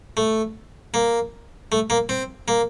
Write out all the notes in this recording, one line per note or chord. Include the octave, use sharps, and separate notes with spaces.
A3
A#3
A3
A#3
C4
A#3